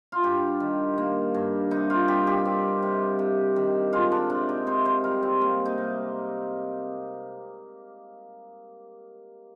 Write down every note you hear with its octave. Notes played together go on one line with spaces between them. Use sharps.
F4
G2 G4
D#3
A#3
G2
C3 D#4
F4
G3 G4
G4
C4
C3
C3
D#3
G#3 F4
D4
C3 D4
D#4
C3 C5
C5
G3 A#4
C4
A#3
D#4
C3